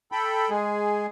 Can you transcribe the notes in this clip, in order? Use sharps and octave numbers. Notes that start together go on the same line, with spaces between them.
A4 G5 B5
G#3 G#4